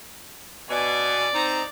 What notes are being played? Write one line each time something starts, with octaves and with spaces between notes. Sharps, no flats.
B2 D5 G#5
C4 D#4 A#5